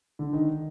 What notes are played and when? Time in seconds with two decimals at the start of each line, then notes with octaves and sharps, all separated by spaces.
0.19 D3
0.33 D#3